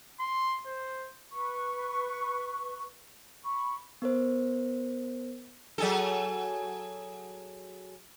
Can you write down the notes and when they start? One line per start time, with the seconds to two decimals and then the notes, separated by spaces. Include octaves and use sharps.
0.20 C6
0.67 C5
1.32 B4 C#6
3.44 B5 C#6
4.02 B3 A#4 C5
5.78 F#3 G#4 A4